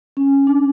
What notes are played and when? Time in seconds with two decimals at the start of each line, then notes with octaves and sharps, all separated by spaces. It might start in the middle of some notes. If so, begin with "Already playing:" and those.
0.17 C#4
0.47 D4